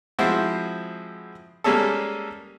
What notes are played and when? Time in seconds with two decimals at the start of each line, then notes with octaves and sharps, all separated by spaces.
0.19 F3 G#3 C4 E4 F#4
1.64 G3 G#3 A#3 C#4 G#4 A4